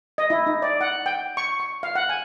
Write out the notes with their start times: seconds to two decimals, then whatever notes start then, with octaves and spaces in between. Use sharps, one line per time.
0.18 D#5
0.30 E4
0.47 D#4
0.62 D5
0.81 F#5
1.06 G5
1.37 C#6
1.60 C#6
1.83 F5
1.95 F#5
2.09 G#5